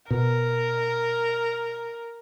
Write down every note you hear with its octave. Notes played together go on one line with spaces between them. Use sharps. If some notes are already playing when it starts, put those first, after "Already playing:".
B2 A#4